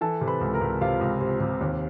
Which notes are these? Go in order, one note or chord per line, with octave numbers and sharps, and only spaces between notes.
E3 A4 A5
C3
B4 B5
C#2
A#4 A#5
C#2
C3 F4 F5
C#2
C3
C3
D#2